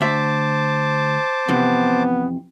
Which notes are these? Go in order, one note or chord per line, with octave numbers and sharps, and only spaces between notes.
D2 C5 E5 A5 D6
F2 C3 E3 B3